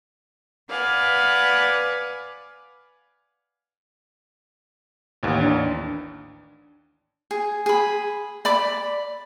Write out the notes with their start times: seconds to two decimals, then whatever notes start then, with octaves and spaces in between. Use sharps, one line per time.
0.69 B4 D5 F5 F#5 G#5
5.23 A1 D#2
5.41 D4
7.31 G#4
7.66 G#4 B5
8.45 D5 B5 D6